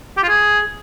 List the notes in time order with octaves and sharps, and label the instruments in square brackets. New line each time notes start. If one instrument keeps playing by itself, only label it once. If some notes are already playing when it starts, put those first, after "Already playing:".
[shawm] G4
F4
G#4